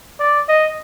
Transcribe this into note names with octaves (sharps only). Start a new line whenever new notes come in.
D5
D#5